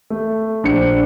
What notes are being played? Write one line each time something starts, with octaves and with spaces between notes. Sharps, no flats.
A3
A#1 D4 C5 C#7